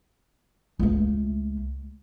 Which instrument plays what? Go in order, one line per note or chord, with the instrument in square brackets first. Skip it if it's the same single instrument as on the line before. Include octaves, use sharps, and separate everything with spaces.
[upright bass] C#2 A3